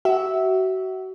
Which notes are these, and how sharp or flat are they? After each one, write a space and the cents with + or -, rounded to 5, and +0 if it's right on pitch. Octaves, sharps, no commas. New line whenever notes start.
F#4 +30 E5 -10